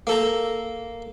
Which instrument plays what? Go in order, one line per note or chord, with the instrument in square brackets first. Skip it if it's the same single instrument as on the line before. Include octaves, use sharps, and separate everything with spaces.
[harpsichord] A#3 A4 A#5